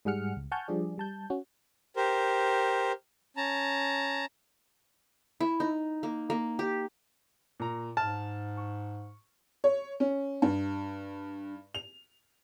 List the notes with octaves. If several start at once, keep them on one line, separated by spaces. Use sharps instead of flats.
G#2 G3 G#4 F#5 F6 C#7
C#2
F#5 G#5 A5 C#6 F6 G6
F3 G3 D4 G#4 D5
G3 A5 G6
C#4 F#4
G4 A#4 C5
C#4 A5 A#5
E4
D#4
A#3
A#3
G4
A#2 A#5
G#2 A5 F6
C#6
C#5
C#4
G2
F7